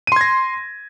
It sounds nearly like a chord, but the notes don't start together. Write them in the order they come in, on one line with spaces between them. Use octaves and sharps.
D#7 C6 G#6 A#6